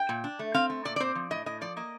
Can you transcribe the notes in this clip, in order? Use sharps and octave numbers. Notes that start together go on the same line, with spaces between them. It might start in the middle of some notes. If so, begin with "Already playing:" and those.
Already playing: G5
A#2
D4
A3
C4 F5
A3
A#2 D5
D5
C4 C5
F3
A2 D#5
A2 D#5
F3 D5
A#3 D#5